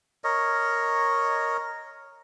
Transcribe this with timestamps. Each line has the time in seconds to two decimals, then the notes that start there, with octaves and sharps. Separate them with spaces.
0.24 A#4 C#5 D#5